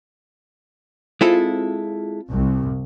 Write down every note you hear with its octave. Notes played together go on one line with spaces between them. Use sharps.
G#3 C4 E4 F4 A4
C2